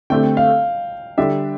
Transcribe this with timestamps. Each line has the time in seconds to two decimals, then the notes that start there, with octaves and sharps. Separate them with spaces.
0.10 D3 A3 C4 G4 G5
0.37 F5
1.18 D3 G3 D4 G4 E5